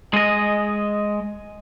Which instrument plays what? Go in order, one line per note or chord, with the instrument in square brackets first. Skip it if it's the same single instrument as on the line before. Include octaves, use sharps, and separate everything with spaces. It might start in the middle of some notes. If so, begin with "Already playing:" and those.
[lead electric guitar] G#3 D#5